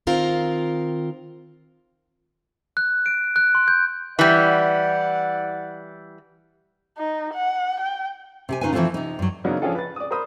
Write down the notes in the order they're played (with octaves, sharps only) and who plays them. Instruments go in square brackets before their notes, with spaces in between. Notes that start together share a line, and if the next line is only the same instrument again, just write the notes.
[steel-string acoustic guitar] D#3 C4 F4 A#4
[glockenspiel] F#6
D7
F#6
C6
G6
[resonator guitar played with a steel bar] E3 G3 [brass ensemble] D5 F#5
[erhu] D#4
F#5
G5
[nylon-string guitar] C3 G4 G#5
C#3 D#4 F4 B4 G#5
E3 F3 G3 A3 C4 F4
C3 D#4
G2 F#3
[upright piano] C#3 F#3 A#3 B3 D4 D#4
F3 C#4 D4 F4 G#4 A4
B4 A6
D5 D#6
A#4 C5 B5 D#6